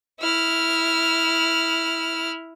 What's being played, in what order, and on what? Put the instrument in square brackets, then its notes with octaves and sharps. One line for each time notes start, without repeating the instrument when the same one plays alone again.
[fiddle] E4 F6